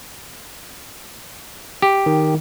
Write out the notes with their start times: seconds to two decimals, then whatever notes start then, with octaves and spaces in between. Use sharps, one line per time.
1.82 G4
2.06 D#3